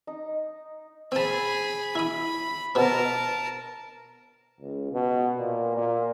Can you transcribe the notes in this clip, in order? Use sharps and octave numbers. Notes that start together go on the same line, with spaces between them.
D#4
C4 G#4 A5 B5
E4 B5 D#6
B2 C4 A#4 A5
C#2
B2
A#2
A#2